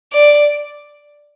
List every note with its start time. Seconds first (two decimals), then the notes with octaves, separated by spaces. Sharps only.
0.12 D5